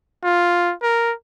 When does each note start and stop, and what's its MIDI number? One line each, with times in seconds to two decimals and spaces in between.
0.24 0.74 65
0.82 1.13 70